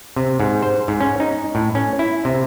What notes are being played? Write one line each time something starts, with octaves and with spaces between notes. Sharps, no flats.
C3
G#2
C5
G#2
C#4
D#4
A2
C#4
E4
C3